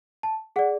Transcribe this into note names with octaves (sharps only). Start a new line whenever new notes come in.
A5
G#4 D5 F#5